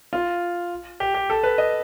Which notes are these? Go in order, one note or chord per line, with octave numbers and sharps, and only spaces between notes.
F4
G4
G4
A4
B4
D#5